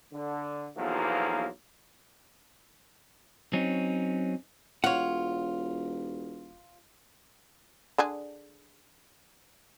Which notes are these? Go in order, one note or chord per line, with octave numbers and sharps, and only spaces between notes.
D3
B1 E2 F3 F#3 A#3
F#3 C4 C#4 D#4
E1 F4 C#5 F#5
D3 D4 G#4